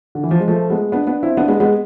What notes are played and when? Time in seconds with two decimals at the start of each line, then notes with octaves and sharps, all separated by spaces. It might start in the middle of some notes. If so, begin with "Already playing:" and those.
0.15 D3
0.23 E3
0.31 F3
0.40 G#3
0.48 F3 A3
0.70 G#3 B3
0.92 B3 D4
1.07 B3 D4
1.23 C4 E4
1.37 B3 D4
1.48 G#3 B3
1.60 G#3 B3